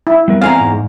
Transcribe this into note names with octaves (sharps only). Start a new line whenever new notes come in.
E4
G3 B3 A#4
E2 G#3 C4 A4 F5 G#5 A#5
G#2